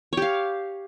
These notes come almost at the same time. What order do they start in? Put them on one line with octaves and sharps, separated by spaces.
C#5 G4 F5